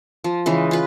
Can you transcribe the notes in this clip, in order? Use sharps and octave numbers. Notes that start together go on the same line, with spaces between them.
F3
C#3 E3 G#3
F4 B4